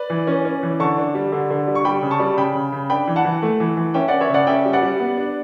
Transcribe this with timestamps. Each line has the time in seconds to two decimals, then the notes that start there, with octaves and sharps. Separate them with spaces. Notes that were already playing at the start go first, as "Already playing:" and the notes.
Already playing: B4 D5
0.10 E3
0.27 C#4
0.45 C#4
0.63 E3
0.80 D3 A5 C#6
0.97 D4
1.15 G3
1.32 D3
1.50 D3
1.67 G3
1.75 C#6
1.85 G3 G5 B5
2.02 C#3
2.11 A5 C#6
2.20 G3
2.37 C#3 G5 B5
2.55 C#3
2.72 C#3
2.90 D4 G5 B5
3.07 E3
3.16 F#5 A5
3.25 E3
3.42 A3
3.60 E3
3.77 E3
3.94 C#4 E5 G5
4.08 C#4 D5 F#5
4.21 C#5 E5
4.30 C#3 D5 F#5
4.47 C#4 E5 G5
4.65 G3
4.73 D5 F#5
4.82 G3
5.00 B3
5.17 D4